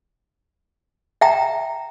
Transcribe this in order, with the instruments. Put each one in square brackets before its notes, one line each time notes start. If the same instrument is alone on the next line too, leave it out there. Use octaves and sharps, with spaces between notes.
[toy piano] E5 G5 A#5